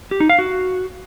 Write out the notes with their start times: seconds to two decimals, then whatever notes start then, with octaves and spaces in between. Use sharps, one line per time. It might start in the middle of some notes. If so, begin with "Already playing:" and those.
0.11 G4
0.20 D#4
0.29 F5
0.39 F#4